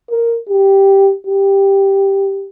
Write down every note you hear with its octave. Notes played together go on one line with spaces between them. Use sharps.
A#4
G4
G4